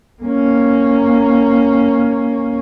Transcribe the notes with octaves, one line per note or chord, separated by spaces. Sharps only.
A#3 C#4